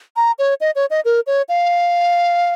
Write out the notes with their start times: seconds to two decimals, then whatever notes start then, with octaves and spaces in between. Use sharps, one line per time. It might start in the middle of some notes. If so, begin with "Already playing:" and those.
0.16 A#5
0.39 C#5
0.61 D#5
0.76 C#5
0.90 D#5
1.05 A#4
1.27 C#5
1.49 F5